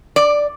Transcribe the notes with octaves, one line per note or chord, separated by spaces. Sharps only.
D5